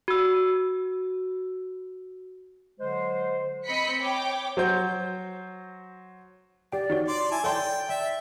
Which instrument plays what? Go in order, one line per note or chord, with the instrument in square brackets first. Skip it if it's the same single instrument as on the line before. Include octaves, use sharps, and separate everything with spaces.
[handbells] F#4 E6
[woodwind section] D3 F#3 G#3 C5
[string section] C4 D#5 B5 B6 C#7
C#5 G5 D6
[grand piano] F#3 C5 G6
[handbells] G4 G5 [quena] D5
[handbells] D#4 F#4 C#5
[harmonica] D5 [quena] C6
[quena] E4 [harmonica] G#5 A5
[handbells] A4 C#5 C6 [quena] D5 [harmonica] G5
[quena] D5 [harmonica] E5 [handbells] G5